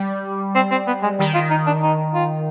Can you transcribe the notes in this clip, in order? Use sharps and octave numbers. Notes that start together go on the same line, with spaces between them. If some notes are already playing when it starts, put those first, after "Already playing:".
Already playing: G3
C4
C4
B3
G#3
D#3 G3
F4
D#4
D4
D#4
F4